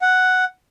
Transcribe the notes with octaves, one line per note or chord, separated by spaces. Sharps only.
F#5